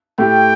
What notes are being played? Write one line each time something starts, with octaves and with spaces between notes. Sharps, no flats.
A2 A3 G4 G5